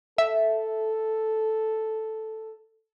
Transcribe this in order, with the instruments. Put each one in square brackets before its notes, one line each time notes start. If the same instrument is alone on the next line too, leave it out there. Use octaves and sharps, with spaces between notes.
[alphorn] A4 [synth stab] E5